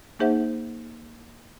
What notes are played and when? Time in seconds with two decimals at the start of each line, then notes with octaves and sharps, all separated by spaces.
0.19 A#3 D#4 G#4 C5 E5 F#5